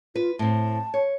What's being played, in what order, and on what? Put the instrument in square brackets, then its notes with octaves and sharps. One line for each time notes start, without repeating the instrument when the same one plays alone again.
[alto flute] F4 [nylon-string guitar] B4
[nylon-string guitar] A2 C4 [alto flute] A5
[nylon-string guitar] C#5